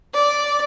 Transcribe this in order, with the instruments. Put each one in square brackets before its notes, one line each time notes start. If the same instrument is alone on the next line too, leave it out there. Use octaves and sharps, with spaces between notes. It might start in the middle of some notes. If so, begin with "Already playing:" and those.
[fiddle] D5